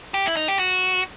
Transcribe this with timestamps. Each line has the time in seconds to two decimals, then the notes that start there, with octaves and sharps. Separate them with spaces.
0.14 G4
0.26 E4
0.37 D#4
0.48 G4
0.59 F#4